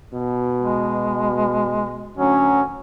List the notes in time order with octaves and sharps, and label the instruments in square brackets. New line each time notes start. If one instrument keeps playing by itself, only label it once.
[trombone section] B2
[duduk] G#3
[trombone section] D2 F#3 [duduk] C#4